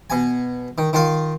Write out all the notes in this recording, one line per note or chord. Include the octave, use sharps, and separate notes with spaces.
B2 G#5
D#3
D#3 F4 F5